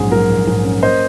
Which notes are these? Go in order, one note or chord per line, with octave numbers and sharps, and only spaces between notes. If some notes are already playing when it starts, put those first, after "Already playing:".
Already playing: A#1 G#2 F#3 C#4 G#4
F#3 A#4
A#1
G#2
C#4
A#3 C5 D#5